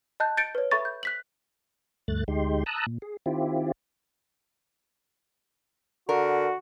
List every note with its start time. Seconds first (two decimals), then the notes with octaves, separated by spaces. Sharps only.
0.20 D#5 A5 F#6 G6
0.37 G6 A6 C#7 D7
0.55 B4 C#5
0.71 A4 E5 B5 C#6 A6
0.85 G6
1.03 F#6 B6 F#7
2.08 D2 G2 A3 F#6 A6
2.28 D2 G#3 D#4 G4 C6
2.66 A5 A#5 D#6 E6 F#6
2.86 A#2
3.02 G#4
3.26 D#3 C4 E4 F4 G4
6.09 D3 F#4 A#4